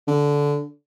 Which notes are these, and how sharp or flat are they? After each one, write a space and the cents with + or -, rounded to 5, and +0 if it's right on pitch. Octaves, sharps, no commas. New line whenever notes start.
D3 -15